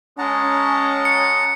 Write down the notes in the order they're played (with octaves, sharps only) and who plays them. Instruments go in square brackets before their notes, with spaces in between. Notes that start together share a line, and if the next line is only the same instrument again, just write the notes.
[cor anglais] G#3 [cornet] C#4 [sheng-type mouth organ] F#5 A5 A#5
[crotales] C#7